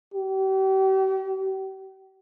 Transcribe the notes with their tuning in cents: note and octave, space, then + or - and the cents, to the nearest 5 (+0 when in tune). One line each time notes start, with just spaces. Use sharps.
G4 -40